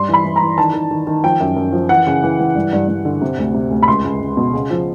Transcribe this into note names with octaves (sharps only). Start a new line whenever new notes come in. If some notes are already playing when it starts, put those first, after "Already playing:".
Already playing: G2 C6
E3 B5
E3
E3 A#5
D#3 A5
D#3
D#3
D#3
F3 G5
F#2
F#2
F3
E3 F#5
C#3
E3
E3
G2
G2
G2
D3
C3
D2
C3
D2
B5
C#2 C6
C#2
C#2
B2
C#3
F3